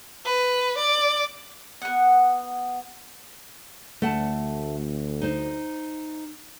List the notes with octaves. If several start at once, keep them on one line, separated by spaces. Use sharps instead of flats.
B4
D5
B3 F#5
D2 A3 F#5 A5
D#4 C5